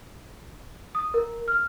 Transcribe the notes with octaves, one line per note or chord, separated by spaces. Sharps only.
D#6
A#4
F6